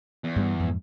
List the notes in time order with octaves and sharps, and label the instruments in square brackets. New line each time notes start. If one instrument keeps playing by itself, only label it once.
[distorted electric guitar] E2
[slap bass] G2 G3 B3
F2 G#2